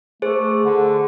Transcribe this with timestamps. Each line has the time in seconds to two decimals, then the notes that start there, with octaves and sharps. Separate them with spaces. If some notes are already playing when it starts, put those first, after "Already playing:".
0.22 A3 G#4 C5
0.65 D3